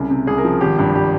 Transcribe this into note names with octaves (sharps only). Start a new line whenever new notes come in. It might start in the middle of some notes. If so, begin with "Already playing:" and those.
Already playing: C2 C#3
C3
C2 G#4
A#4
F3
G#1 G4
G2
G3 G4